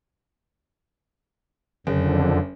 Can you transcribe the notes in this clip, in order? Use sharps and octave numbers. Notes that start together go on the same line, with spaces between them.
F#1 F2 D3